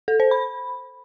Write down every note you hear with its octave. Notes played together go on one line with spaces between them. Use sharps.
A4
C5
B5